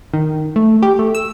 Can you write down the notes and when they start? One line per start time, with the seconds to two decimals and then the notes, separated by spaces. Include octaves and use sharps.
0.13 D#3
0.56 A3
0.82 G4
0.99 A3
1.15 E6